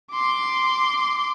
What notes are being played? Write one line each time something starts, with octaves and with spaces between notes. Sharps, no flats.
C6 D6